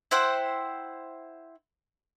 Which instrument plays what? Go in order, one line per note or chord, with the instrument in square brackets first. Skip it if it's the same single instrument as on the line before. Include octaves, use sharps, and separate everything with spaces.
[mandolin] E4 C5 F#5 G5